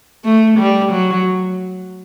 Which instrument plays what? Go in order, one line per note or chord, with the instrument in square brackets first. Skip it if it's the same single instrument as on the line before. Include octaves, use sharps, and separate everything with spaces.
[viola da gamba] A3
G3
F#3